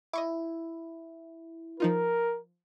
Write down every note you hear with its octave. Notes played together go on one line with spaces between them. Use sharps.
E4 D#5 C#6 D6
F3 D#4 F4 A#4